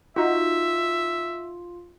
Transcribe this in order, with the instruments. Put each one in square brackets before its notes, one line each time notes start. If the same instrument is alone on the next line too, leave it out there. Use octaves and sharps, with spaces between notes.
[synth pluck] D#4 F#4 [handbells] F4 [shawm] E5